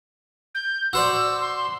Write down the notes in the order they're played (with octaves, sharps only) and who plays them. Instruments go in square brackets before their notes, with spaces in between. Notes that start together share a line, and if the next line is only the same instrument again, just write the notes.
[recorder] G6
[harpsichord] F#4 C5 D5 [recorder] E6
[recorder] C6